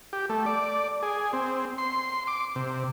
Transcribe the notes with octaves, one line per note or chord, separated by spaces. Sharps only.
G4
A3
D5
G#4
C4
C6
D6
C3